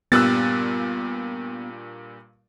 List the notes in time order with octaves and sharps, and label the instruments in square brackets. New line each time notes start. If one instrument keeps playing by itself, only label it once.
[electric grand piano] G2 A#2 G3 [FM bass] B3 [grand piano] E6 F#6 A6